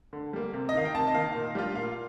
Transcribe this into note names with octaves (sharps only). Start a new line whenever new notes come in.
D3
G3 A#3
C3
D#5
D#3 A#3 D#4 F5
G5
C3 A5
D#5
D#3 A#3 D#4 F5
A#2
G3 D4 F4
A#2 F5